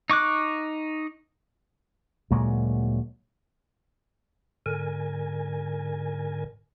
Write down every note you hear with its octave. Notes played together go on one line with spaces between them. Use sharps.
D#4 C#6 D6 F#6
D2 A#2 F#3 G#3
G#2 D3 A#4 G#5